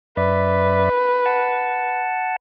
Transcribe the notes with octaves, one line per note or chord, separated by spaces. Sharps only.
F#2 B4 D5 E5
F#5 A5